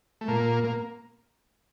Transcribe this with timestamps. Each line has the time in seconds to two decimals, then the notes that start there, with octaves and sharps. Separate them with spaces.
0.21 A3
0.28 A#2 A#3
0.64 A#3